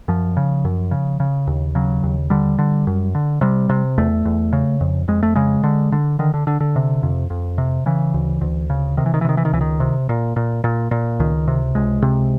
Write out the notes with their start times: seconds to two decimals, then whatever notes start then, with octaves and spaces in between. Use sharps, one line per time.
0.08 F#2 F3
0.37 C#3
0.65 F#2
0.91 C#3
1.20 C#3
1.47 D#2
1.75 C#3 F#3
2.03 D#2
2.30 D3 G3
2.58 D3
2.87 F#2
3.15 D3
3.41 C3 G3
3.70 C3
3.98 E2 A3
4.25 E2
4.53 C#3
4.81 F2
5.08 F2 G#3
5.23 A3
5.35 C#3 G#3
5.63 D3
5.92 D3
6.19 D3 D#3
6.34 D3
6.47 D3
6.60 D3
6.76 C3
7.03 F2
7.30 F2
7.58 C3
7.86 C#3 E3
8.14 D2
8.41 D2
8.70 C#3
8.97 C3 D#3
9.06 E3
9.14 D#3
9.21 E3
9.25 C3 D#3
9.37 E3
9.45 D#3
9.53 C#2 E3
9.61 D#3
9.80 C3
10.09 A#2
10.36 A#2
10.64 A#2
10.91 A#2
11.20 C#2 D#3
11.48 C3
11.75 C#2 G#3
12.02 C3